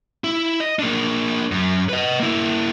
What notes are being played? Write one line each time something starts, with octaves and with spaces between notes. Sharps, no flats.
E4
D#5
A#3 D4
F#2
B4 D#5
A#3 E4